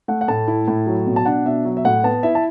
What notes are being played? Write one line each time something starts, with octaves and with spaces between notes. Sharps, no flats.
A3 F#5
F#5
A2 A5
E4
A2
F#3
B2
A5
D4 F#5
B2 E5
F#3
E5
A2 F#5
B3 A5
E4 E5
A5